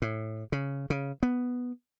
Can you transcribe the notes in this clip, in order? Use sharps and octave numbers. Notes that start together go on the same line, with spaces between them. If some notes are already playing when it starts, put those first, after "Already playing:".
A2
C#3
C#3
B3